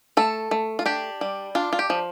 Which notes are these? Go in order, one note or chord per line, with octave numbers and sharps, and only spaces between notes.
A3 A4
A3
F4
D4 G4
G3
D4 F4
F4
G4
F3